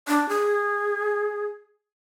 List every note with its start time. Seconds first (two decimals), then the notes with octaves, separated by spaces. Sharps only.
0.08 D4
0.29 G#4